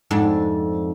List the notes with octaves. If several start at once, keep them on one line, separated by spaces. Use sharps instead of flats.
F2 G#2 D4